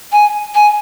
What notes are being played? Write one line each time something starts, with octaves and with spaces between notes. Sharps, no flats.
G#5
G#5